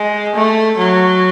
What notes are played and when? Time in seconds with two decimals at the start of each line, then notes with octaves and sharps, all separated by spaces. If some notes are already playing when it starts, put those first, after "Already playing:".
Already playing: G#3
0.35 A3
0.78 F#3